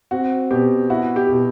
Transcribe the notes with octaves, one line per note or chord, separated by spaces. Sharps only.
C4 F#4
B2 G4
E4 F#4
G4
B2